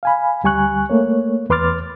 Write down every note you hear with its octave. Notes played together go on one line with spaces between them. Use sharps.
F5 G#5 B5
D2 G3 G#5 C#6 F#6
A3 A#3 C#5
E2 B4 C6 D6 F6 A6